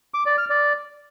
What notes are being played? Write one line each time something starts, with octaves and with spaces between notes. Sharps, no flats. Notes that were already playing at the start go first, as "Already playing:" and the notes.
D6
D5
F6
D5